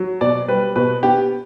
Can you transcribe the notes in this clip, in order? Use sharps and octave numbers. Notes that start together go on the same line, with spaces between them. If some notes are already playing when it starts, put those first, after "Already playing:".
Already playing: F#3
B2 D5
G3 B4
B2 B4
B3 G4